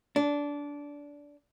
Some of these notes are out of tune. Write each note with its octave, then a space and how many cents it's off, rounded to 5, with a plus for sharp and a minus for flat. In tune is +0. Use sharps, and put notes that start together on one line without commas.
D4 -20